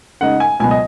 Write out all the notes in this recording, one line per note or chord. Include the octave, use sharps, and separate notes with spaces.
C#3 G#3 D#4 F#5
G#5
C#2 B2 F#3 B3 G#5
D#5